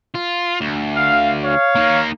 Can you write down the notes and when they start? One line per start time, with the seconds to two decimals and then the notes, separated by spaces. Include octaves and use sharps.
0.15 F4
0.61 D2
0.94 F5
1.44 C#5 F5
1.75 A#3 D#4